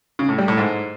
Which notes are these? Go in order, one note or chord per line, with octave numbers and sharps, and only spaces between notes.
C#3
A2
G3
A2
G#2